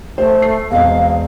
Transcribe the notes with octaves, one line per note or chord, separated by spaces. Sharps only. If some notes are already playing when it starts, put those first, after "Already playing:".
A3 C5
C7
E1 C4 D#5 F5